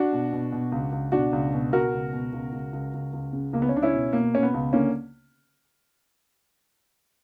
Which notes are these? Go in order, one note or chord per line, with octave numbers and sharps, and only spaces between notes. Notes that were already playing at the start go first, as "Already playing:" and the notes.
Already playing: D4 F#4
B2
B2
B2
C#2
C#2
B2 D4 F#4
C#2
B2
B2 F#4 A#4
C#2
B2
C#2
C#2
C#2
C#2
C#2
C#3
C#2 A#3
B3
C#4
C#2 D4
C#4 E4
B2
B2 A#3
B2 C#4
B3
C#2
D3 A#3 C#4